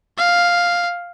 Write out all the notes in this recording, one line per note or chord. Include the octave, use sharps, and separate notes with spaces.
F5